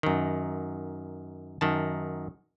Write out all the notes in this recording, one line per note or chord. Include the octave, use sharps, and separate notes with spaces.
F#2 D#3
F#2 D#3 A5